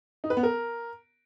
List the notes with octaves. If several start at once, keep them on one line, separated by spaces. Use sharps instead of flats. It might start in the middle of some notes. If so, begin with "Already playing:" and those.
D#4
B4
B3
A#4